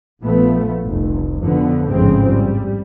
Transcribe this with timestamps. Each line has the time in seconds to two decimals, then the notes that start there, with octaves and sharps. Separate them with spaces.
0.22 A#1 F3 A3 B3
0.84 F1 C2
1.41 F2 B2 D3 B3
1.89 A1 F2 G#2 C#3 G#3 C4
2.28 G3